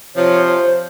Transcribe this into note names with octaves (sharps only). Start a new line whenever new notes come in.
C3 F3 C#5
C5